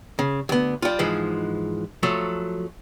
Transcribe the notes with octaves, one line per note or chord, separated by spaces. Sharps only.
C#3
D2 B3
G3 F4
G#2 E3 F3 G#3
F3 F#3 A3